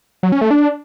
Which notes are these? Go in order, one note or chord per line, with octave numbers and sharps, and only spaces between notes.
F#3
C#4
A3
D4